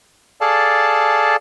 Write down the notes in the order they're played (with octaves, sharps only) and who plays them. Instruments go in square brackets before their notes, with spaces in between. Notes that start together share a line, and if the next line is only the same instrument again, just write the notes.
[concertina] G#4 A4 D5 F5 A5